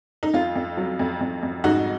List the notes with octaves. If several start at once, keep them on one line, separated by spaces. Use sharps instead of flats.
D#4
F2 F4
F2
F#3
F2
F2
F2
G#2 D#4 F#4